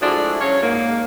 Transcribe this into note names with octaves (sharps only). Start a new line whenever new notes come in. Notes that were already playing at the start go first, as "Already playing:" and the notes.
F3 G#3 A3 D4 E4 F#4
C#3 F#3 C#4 C#5
G#2 A#3